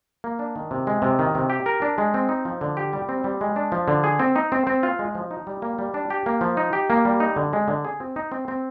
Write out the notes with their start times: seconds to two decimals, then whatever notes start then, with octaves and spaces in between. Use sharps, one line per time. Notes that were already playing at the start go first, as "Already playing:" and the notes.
0.24 A#3
0.39 D4
0.56 D#3
0.71 C3
0.87 G#3
1.02 C3
1.19 D#3
1.35 C3
1.50 G4
1.66 A#4
1.82 D4
1.98 G#3
2.14 C4
2.29 D#4
2.45 F3
2.61 D3
2.77 G4
2.93 G3
3.09 C4
3.24 G3
3.41 G#3
3.56 D4
3.72 F3
3.88 D3
4.04 G#4
4.19 C4
4.36 D#4
4.52 C4
4.67 C4
4.83 F4
4.99 G#3
5.15 F3
5.31 D#4
5.47 G3
5.62 A#3
5.79 G3
5.94 D4
6.10 G4
6.26 A#3
6.41 F3
6.57 D#4
6.73 G4
6.90 A#3
7.05 G3
7.20 D#4
7.36 D3
7.53 G#3
7.68 D3
7.85 G#4
8.00 C4
8.16 D#4
8.32 C4
8.48 C4